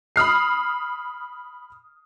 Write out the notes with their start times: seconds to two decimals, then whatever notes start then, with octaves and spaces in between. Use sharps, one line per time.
0.16 B5 D#6 F6 C7